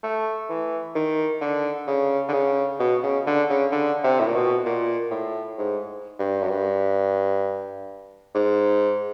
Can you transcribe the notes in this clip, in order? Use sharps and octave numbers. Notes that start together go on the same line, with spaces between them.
A3
E3
D#3
D3
C#3
D3
C#3
B2
C#3
D3
C#3
D3
C3
A2
A#2
B2
A#2
A2
G#2
G2
F#2
G2
G#2